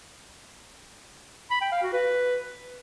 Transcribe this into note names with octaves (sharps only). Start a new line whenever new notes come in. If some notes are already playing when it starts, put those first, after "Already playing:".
B5
G5
F5
F#4
B4